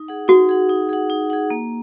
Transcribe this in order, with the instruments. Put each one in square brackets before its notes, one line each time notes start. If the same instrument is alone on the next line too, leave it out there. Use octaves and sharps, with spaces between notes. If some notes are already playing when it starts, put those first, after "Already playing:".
Already playing: [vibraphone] D#4
G#4 F#5
[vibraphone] D#4 [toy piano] F#4
[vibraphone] G#4 F#5
D#4
G#4 F#5
D#4
G#4 F#5
A#3